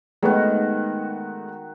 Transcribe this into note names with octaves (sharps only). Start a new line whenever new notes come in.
D#3 G#3 A3 B3 F#4